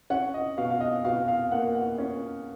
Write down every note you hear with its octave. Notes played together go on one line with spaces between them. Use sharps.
C#4 F#5
D#5
B2 F5
F5
D#5
B2 F5
F5
A#3 F#5
F#5
C#4